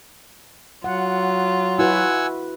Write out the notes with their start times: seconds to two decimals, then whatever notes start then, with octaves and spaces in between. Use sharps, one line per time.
0.84 F#3 F4 F#5
1.79 E4 F#4 B4 F#5 G#5 E6